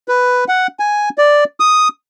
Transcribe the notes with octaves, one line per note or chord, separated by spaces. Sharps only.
B4
F#5
G#5
D5
D#6